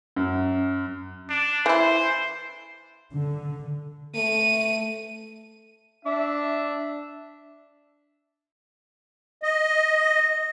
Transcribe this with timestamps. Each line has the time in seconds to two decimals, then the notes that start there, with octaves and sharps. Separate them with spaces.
0.16 F#2
1.29 D4
1.66 E3 E4 C5
3.11 D3
4.15 A3 D#7
6.05 D4 E5
9.43 D#5